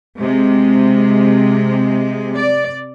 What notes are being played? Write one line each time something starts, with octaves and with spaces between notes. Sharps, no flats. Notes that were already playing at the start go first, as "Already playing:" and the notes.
C3 G#3
D5